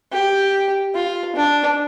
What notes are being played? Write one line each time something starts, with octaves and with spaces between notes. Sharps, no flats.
G4
F4
D4